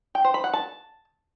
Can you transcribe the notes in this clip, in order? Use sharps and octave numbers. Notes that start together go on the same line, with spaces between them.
G5
C5
B5
F#5
A5